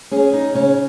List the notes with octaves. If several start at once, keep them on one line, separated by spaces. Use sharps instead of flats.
C#4 G#4
D#4
C#3 C#4